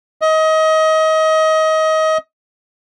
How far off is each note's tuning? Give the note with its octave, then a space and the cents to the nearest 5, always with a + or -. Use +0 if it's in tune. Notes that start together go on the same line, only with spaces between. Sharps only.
D#5 +25